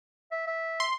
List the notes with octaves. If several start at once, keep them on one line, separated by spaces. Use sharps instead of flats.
E5
E5
C6